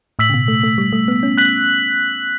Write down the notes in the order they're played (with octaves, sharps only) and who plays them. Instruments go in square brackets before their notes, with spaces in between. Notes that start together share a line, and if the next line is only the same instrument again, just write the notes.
[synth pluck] A2 [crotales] E6 B6 F#7
[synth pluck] C#3
B2
A3
A3
G3
A3
B3
C#4
[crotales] F#6 B6 F#7